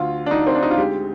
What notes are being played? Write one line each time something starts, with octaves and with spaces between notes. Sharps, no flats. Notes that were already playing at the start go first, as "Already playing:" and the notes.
Already playing: D2 F4
D4
D2 D#4
C4
D4
D#4
F4
G#3 G4